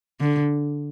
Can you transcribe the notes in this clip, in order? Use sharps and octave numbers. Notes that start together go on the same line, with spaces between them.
D3